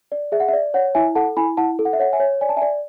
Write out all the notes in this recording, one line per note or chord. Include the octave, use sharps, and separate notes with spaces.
D5
G#4 E5
F#5
E5
D5
C#5 F#5
E4 E5 G#5
A4 F#5 A5
E4 G#5 B5
E4 F#5 A5
A4
F#5
E5
C#5 F#5
E5 G#5
C#5
D5 G#5
A5
E5 G#5
D5